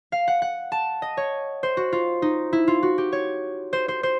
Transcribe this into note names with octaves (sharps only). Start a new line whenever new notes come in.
F5
F#5
F#5
A5
D#5
C#5
C5
F#4
F4
D#4
E4
F4
F#4
G4
C#5
C5
C5
C5